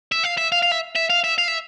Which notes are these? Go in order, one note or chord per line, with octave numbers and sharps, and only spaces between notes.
E5
F5
E5
F5
F5
E5
E5
F5
E5
F5
E5